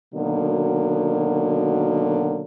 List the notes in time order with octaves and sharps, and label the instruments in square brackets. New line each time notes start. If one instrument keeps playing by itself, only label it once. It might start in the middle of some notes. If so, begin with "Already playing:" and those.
[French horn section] B2 D3 D#3 F#3 A#3